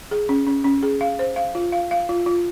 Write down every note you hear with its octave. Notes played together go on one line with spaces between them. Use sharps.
G#4
C#4
C#4
C#4
G#4
F5
C5
F5
F4
F5
F5
F4
F4